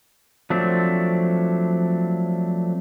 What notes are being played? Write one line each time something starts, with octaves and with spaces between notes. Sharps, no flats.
F3 F#3 A3 C4 D4